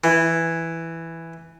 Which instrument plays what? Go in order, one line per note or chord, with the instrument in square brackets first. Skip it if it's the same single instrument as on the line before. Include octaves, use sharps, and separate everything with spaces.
[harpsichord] E3